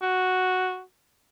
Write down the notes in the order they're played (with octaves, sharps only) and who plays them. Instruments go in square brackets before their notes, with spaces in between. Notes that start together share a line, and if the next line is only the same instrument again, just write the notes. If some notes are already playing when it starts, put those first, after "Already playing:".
[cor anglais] F#4